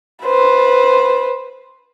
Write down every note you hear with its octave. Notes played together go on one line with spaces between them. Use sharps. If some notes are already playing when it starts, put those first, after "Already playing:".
B4 C5